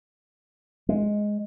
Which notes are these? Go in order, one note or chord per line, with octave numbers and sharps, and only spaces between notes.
G#3